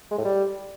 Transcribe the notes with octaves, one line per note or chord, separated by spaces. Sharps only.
G#3
A2
G3